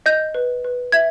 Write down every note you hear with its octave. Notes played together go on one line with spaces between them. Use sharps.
D#5 G6
B4
B4
E5 G#6